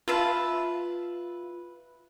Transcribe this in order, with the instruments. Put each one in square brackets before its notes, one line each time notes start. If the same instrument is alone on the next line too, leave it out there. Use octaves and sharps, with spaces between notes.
[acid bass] F4 [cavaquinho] B4 E5 A5